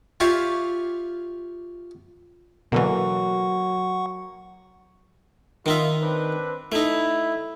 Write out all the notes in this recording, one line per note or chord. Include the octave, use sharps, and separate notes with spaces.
F4 G4 C#5 D5 E5 F5
B2 D3 E3 F#3 A#3 F#5 C#6
D#3 B3 D#4 F4 E5
C4 D4 B4
A3 D#4 E4